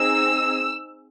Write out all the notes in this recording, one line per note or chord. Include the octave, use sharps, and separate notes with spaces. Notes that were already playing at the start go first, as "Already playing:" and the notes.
Already playing: C4 D#4 G#4 E6